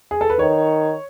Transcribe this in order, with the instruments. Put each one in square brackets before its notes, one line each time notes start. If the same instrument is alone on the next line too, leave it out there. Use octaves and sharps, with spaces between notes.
[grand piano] G#4
A4
B4
[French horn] D#3 [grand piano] C#5